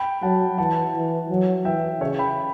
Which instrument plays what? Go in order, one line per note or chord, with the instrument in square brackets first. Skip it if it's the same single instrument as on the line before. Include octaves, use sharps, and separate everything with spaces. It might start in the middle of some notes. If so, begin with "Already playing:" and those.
Already playing: [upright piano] G5 B5
[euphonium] F#3 [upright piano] F#5 A5
[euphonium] E3 [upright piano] F#5 A5
[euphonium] E3
F#3
[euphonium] E3 [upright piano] E5 G5
[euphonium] C#3 [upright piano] C#5 E5
[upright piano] G5 B5